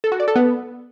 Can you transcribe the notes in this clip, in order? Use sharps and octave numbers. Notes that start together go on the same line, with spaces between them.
A4
F#4
D5
A4
B3